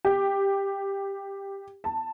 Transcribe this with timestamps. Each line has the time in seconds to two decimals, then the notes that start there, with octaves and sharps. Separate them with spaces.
0.05 G4
1.84 A5